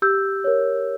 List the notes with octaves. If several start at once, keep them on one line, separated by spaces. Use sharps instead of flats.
G4 E6 G6
A#4 C#5